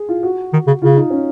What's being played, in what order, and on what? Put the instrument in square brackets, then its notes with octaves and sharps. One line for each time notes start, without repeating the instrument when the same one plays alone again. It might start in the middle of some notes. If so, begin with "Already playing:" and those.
Already playing: [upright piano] G#4
F4
F#4
[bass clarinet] D#3
C#3
[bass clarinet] C#3 [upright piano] F4
[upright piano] D#4
C#4